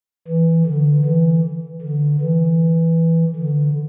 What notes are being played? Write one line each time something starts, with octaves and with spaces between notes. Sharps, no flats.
E3
D3
E3
D3
E3
D3